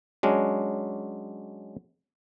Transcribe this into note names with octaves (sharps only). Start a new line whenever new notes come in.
F#3 G#3 C#4 D4